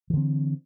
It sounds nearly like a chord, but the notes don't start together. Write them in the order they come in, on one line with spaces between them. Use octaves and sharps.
E3 D3 C4